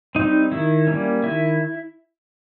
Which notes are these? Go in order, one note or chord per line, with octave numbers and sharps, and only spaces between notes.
G3 C4 D#4
D#3 E4
G3 A#3 C#4
D#3 E4